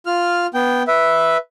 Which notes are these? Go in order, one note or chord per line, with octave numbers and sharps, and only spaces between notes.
F4 F6
B3 G5
B4 E5